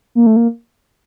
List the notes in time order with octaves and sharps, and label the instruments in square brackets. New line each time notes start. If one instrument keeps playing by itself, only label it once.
[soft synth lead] A#3
A3
A#3